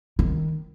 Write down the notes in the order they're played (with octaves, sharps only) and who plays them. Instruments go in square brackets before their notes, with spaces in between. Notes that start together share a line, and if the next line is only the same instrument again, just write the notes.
[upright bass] D#3